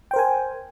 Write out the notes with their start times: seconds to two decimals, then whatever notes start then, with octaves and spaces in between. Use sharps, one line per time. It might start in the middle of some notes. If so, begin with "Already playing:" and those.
0.11 G5
0.14 C5
0.16 A#4
0.19 G#5